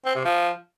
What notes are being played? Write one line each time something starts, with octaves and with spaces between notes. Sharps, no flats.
C4
C3
F3